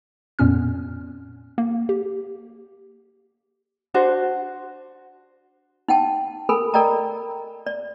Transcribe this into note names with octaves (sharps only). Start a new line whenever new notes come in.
F2 A#2 B3 C#4 F6
A#3
G4
D4 F#4 C5
D#4 F#5 G5 A5
A4 A#4 G#5 B5
A4 A#4 D5 D#5 G5 A#5
D5